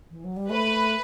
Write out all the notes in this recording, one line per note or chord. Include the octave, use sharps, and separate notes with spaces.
E3
F#3
G3
A3 B4